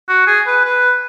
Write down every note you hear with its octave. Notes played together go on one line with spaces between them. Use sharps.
F#4
G#4
B4
B4